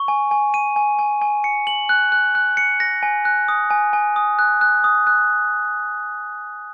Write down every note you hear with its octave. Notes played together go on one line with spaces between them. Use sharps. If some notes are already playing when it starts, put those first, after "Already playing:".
Already playing: C#6
G#5
G#5
D#7
G#5
G#5
G#5
C#7
F#7
F#6
F#6
F#6
C#7
A#6
G#5
F#6
D#6
G#5
G#5
D#6
F#6
F#6
D#6
F#6